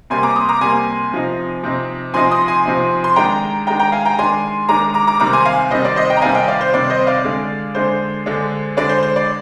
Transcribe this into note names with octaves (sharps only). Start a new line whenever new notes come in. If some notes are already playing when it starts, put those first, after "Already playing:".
C3 G3 A#3 G#5 C6
A#5 D6
C6 D#6
A#5 D6
C3 G3 A#3 G#5 C6
C3 F3 C4 D#4
C3 F3 C4 D#4
C3 F3 C4 D#4 G#5 C6
C6 D#6
G#5 C6
C3 F3 C4 D#4
C6
D#3 G#3 D4 G5 A#5
D#3 G#3 D4 G5 A#5
G5 A#5
F5 G#5
G5 A#5
D#3 G#3 D4 G#5 C6
D#3 G#3 D4 A#5 D6
A#5 D6
A#5 D6
C3 D#3 G3 C4 A#5 D6
G#5 C6
F5 G#5
C3 D#3 G3 C4 C5 D#5
D5
C5 D#5
D#5 G5
A#5
C3 D#3 G3 C4 F5 G#5
D#5 G5
D5 F5
C5
C3 D#3 G3 C4 D5
C5 D#5
D5 F5
D3 G#3 D4
D3 G#3 D4 C5
D3 G#3 D4
D3 G#3 D4 D5
C5
C5
D5